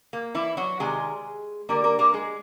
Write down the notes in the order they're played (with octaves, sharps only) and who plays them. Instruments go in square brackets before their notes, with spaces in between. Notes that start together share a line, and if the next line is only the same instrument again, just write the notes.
[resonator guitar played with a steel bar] A#3
E3 E4
F#3 F#4
C3 D#3 G3 G#3 G#4
D3 G3 A#3 A#4
A#3 A#4
A#3 A#4
G#3 G#4